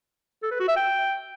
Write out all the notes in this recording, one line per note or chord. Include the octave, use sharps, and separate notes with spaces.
A4
B4
F#4
E5
G5